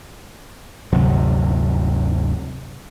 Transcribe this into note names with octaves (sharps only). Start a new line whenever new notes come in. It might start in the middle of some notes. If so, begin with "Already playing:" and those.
G1 D2 C3 F#3